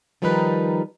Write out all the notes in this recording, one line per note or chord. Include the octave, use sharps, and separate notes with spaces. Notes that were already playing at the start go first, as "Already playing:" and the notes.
D#3 F3 G3 D#4 A#4 B4